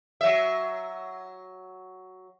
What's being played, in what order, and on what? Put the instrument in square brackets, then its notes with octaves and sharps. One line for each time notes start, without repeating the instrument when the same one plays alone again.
[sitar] F#3 E5